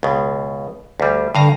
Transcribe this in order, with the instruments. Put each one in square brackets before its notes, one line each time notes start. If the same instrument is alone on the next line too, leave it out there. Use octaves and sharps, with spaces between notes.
[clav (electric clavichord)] C#2 B2
D2 G3
[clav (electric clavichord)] G2 F5 A#5 [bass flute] D3